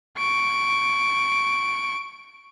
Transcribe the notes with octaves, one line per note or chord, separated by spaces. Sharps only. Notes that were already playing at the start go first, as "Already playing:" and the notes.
C#6 D7